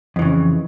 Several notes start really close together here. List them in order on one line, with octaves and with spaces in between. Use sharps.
F2 E3 C#3